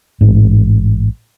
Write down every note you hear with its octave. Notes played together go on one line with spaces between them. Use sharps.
A1 G#2